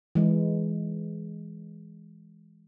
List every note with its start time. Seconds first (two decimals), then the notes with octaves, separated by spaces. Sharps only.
0.15 E3 G#3